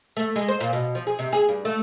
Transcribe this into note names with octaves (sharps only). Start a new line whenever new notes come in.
A3
G#3
C5
A#2
B2
F3
G#4
C3
G#4
G2
A3